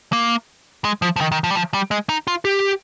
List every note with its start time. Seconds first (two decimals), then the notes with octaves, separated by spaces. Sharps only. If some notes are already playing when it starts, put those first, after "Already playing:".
0.13 A#3
0.85 G#3
1.02 F3
1.16 F3
1.21 D#3
1.32 D#3
1.44 F3
1.51 G3
1.55 F3
1.74 G3
1.91 G#3
2.09 D#4
2.27 F4
2.45 G4